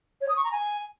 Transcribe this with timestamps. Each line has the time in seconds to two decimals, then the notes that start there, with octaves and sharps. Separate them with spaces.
0.21 C#5
0.28 D#6
0.36 C#6
0.44 A#5
0.51 G#5